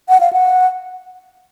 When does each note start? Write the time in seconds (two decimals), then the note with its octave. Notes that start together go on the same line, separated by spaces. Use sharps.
0.09 F#5
0.20 F5
0.33 F#5